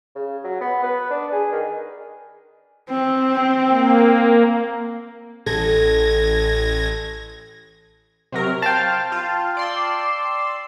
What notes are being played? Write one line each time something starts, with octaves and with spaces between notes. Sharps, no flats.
C#3
F#3
B3
B4
D4
G#4
D#3
C4
A#3
A1 A4 G#6 A#6
C3 F#3 A#4
C5 F5 G5 A5 F6
F4
D5 C6 E6